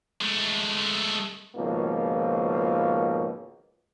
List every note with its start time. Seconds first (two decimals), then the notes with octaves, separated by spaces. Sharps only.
0.21 G#3 A3
1.55 G#1 C#2 B2 F3 A#3